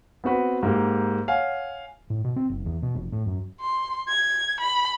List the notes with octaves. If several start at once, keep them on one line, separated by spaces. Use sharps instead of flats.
B3 C4 F#4 B4
G#2 A#3 G4
C#5 F5 F#5 G#5
A2
B2
C4
F#1
E2
B2
F1
A2
F#2
C6
G#6
B5